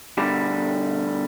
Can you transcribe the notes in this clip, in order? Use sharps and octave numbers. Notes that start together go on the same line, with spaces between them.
B2 D3 G3 G4 A5